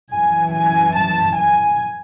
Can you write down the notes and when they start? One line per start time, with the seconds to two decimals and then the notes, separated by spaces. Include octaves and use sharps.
0.12 F#2 E3 G#5
0.54 G#5
0.96 A5
1.37 G#5